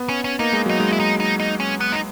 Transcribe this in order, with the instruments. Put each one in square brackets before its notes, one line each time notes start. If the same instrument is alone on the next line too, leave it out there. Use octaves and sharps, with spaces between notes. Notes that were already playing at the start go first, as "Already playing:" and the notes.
Already playing: [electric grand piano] B3
[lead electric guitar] C#4
C#4
[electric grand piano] A#3 [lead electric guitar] D#4
[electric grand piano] G#3
[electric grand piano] F#3 [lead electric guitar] D#4
[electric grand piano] G#3
[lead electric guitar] E4
D#4
D#4
D#4
C#4
B3
D#4